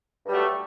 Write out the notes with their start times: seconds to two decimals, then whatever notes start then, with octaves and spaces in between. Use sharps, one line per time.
0.25 G2
0.28 G3
0.31 F#3
0.34 A3